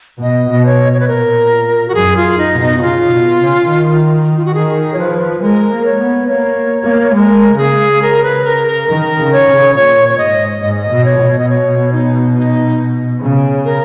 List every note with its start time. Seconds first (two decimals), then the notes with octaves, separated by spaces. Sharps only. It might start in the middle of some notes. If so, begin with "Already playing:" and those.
0.21 B2 D#5
0.51 B2
0.65 C#5
0.92 C#5
1.00 B4
1.08 A#2 A#4
1.88 F#4
1.94 F#2 G#4
2.17 F4
2.38 D#4
2.53 B2
2.60 D#4
2.78 F#4
2.81 C#3 F4
3.11 B2
3.40 C#3
3.68 D#3
4.36 F4
4.45 F#4
4.54 D#3 G#4
4.93 C#5
4.98 F3 B4
5.41 G#3 A#4
5.71 A#3
5.85 C#5
6.00 B3
6.28 A#3 C#5
6.86 A#3
7.15 G#3 A#4
7.58 C#3 G#4
8.02 A#4
8.23 B4
8.45 A#4
8.67 A#4
8.88 D#3 A#4
9.17 C#3
9.32 C#5
9.47 C#3
9.75 A#2 C#5
10.09 C#5
10.18 G#2 D#5
10.61 G#2 D#5
10.79 D#5
10.91 B2
11.05 C#5
11.20 B2
11.39 D#5
11.49 C#5
11.92 D#4
12.35 D#4
13.22 C#3
13.65 A#4